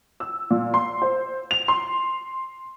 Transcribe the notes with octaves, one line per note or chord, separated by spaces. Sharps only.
E6
A#2
C6
C5
F7
C6